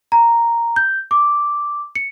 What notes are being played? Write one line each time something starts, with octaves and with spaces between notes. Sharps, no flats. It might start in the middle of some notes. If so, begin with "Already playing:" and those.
A#5
G6
D6
C#7